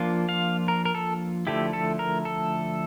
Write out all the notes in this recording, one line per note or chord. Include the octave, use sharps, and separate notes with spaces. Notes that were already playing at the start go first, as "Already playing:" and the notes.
Already playing: F3 A#3 D4 F4
F5
A#4
A#4
A4
D3 F3 A3 E4 G4
A4
A#4
A4